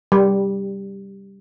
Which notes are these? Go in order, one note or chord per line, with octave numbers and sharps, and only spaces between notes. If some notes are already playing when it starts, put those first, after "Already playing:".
G3